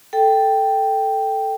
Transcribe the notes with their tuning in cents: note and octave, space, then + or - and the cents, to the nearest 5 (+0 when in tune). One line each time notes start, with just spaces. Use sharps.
A4 +0 G5 +0